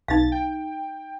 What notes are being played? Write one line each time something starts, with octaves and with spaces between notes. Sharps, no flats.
B1 D#4 F5 A6
G5